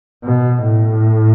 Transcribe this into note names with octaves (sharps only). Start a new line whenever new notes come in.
B2
A2